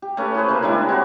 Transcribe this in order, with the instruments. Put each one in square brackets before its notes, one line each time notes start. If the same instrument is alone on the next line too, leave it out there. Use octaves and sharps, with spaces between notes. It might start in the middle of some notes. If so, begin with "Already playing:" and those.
[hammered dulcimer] G4
A3 C#4 B4 C#5
E4 G#4 B4 C5
C#3 A#3
G3 G#3 D4 E4
C4 C#4 F#4